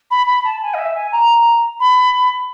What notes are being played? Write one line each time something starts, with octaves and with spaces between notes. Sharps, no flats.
B5
B5
A5
G#5
D#5
E5
G#5
A#5
B5